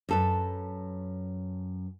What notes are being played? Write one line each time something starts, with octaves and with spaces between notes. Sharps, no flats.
F#2 A4 B4